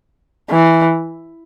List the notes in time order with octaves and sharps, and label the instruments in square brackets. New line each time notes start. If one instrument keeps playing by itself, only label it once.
[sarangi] E3